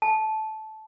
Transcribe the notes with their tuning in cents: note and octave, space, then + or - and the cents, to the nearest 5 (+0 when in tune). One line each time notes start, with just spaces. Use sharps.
A5 -15